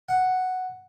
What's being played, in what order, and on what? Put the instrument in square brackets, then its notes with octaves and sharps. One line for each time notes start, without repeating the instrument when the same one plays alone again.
[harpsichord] F#5